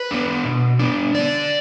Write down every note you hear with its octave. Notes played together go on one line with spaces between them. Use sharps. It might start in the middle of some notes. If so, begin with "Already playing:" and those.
Already playing: B4
B3 D4
B2
B3 D4
D3 D5